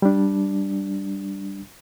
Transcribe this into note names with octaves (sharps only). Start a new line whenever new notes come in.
G3 D4